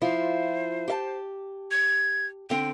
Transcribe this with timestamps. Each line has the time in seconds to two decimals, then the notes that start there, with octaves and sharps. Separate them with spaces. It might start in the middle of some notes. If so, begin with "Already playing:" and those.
0.02 F3 E4 F4 C5
0.88 G4 E5 A5
1.71 G#6
2.50 D3 C4 G5